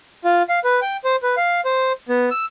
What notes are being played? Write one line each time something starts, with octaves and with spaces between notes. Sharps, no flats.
F4
F5
B4
G5
C5
B4
F5
C5
B3
E6